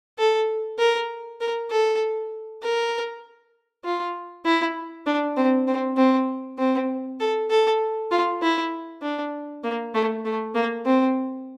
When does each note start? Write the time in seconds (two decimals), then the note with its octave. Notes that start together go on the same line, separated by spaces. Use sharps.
0.19 A4
0.79 A#4
1.41 A#4
1.71 A4
2.63 A#4
3.85 F4
4.45 E4
5.06 D4
5.37 C4
5.67 C4
5.97 C4
6.58 C4
7.20 A4
7.50 A4
8.11 F4
8.42 E4
9.02 D4
9.63 A#3
9.95 A3
10.25 A3
10.55 A#3
10.86 C4